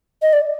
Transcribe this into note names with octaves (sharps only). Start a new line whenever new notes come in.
D#5
D5